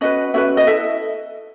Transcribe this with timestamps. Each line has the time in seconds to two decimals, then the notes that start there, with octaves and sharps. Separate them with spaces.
0.01 C#4 F#4 B4 D#5
0.34 C#4 F#4 B4 E5
0.57 D#5
0.67 E4 A4 E5